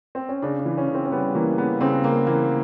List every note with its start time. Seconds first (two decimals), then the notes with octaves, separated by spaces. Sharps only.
0.15 C4
0.29 C#4
0.42 C#3 D4
0.60 D4
0.65 E3
0.78 C#4
0.89 C#3
0.94 C4
1.06 C4
1.12 G3 B3
1.35 E3 A#3
1.58 C#3 B3
1.81 C#3 C4
2.04 C#3 A#3
2.27 E3 A#3